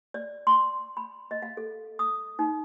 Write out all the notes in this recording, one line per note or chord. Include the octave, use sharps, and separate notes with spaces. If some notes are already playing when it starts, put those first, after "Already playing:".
D5
C6
B5
D#5
F5
A4
D#6
D#4